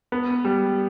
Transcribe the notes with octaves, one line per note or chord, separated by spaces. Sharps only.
B3
G3